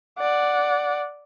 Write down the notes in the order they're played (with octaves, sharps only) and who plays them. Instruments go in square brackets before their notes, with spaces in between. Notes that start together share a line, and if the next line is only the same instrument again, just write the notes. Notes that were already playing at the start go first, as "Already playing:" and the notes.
[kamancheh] D5 F#5